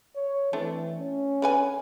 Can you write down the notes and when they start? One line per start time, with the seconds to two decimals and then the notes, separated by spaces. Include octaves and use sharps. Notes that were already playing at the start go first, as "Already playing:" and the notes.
0.16 C#5
0.53 E3 A3 C4 D4
0.99 C#4
1.42 D3 B4 G#5